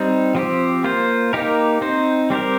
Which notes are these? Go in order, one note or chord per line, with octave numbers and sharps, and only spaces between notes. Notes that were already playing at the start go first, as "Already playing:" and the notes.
Already playing: G3 C4 D#4
F3 C4 G4
A#3 F4 C5
A#3 D#4 G4 A#4
C4 D#4 C5
G3 C4 G4 A#4